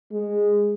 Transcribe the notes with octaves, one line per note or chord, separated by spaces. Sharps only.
G#3